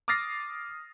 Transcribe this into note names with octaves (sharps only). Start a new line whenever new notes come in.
D6 D#6 F6 A6 A#6 C7